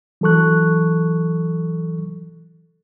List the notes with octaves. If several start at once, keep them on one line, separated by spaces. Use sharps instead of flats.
E3 F#3 A4 C#6 F#6